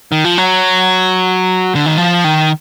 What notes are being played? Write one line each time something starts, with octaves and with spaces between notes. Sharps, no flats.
D#3
F3
F#3
D3
D#3
F3
D#3